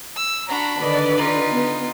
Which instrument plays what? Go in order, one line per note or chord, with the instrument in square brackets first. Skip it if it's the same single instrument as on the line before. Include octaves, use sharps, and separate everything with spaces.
[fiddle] E6
[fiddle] D4 B5 [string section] F#4 A#5
[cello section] D3 B4 [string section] D#3 D5 D#5
[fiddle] D#4 F4
[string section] B3